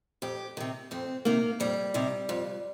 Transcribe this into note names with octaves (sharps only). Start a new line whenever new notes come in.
F2 G4
C3 D#3
F2 C4
C3 D#3 A#3
F2 G3
C3 D#3
F2